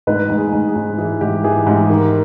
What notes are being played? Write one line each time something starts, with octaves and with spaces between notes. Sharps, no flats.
G#2 B4
G#2
G#4
G#2
G#4
G#2
E3 G#4
G#2 G4
E3 G#4
G#2 G4
D#3